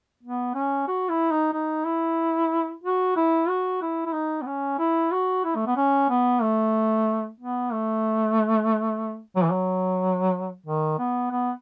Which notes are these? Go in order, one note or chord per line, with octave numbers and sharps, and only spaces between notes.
B3
C#4
F#4
E4
D#4
D#4
E4
F#4
E4
F#4
E4
E4
D#4
B3
C#4
E4
F#4
E4
A3
B3
C#4
B3
A3
B3
A3
F#3
E3
F#3
D#3
B3
B3